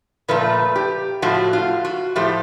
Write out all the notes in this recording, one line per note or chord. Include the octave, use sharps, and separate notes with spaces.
A#2 F3 A3 B4
G4
A2 F3 A3 F#4
F4
F#4
A2 F3 A3 G4